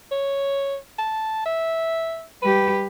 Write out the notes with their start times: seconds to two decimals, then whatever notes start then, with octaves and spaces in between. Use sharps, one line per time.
0.11 C#5
0.98 A5
1.46 E5
2.42 G3 G4 B4